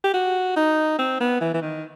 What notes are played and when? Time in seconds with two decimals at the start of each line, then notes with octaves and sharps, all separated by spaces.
0.04 G4
0.14 F#4
0.56 D#4
0.99 C4
1.20 B3
1.41 E3
1.54 E3
1.62 D#3